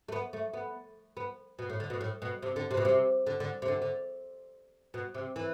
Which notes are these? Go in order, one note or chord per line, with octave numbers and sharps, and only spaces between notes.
A3
B3
A3
B3
B3
B2
A2
D3
B2
A2
B2
C3
D3
C3
B2
C3
D3
D3
C3
D3
D3
B2
C3
E3